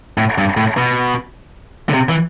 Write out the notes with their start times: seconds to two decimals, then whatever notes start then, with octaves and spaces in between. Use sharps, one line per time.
0.18 A2
0.38 G2
0.57 A2
0.77 B2
1.89 D3
1.94 C3
2.09 E3